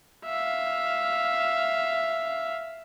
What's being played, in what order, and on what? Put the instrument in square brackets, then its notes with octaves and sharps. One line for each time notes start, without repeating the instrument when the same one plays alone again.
[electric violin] E5 F5